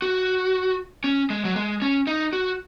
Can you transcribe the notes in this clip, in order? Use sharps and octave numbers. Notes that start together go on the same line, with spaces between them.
F#4
C#4
G#3
F#3
G#3
C#4
D#4
F#4